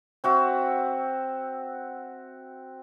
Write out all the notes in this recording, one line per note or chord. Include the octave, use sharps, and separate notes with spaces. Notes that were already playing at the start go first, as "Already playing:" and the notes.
C4 F#4 E5